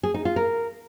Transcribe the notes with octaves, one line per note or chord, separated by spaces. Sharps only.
G#4
D#4
F4
A#4